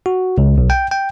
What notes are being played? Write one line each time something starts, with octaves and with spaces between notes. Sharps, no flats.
F#4
C#2
B1
G5
G5